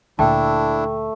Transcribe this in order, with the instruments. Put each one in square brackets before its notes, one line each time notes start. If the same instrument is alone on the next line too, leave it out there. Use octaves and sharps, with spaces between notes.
[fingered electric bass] D2 A#2 [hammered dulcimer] A3 [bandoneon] D4 E4 [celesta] G5 A5